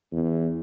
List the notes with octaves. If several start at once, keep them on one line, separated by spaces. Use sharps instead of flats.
E2